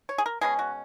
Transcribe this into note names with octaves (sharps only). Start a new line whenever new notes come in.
C#5
G#4
A#4
B2 G#3 C#4 G#4
F#4